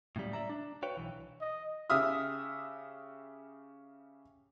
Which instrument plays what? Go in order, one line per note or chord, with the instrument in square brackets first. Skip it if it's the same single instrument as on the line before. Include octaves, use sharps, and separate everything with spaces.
[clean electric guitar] A2 C#3 F#3 G3
D5 E5 A#5
D4
F#4 B4 C#5 F5 G5
B1 E3
[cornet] D#5
[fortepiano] C#3 G4 E5 D#6 F6